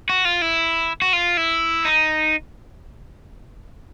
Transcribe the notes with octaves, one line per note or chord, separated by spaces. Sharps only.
F#4
F4
E4
F#4
F4
E4
D#4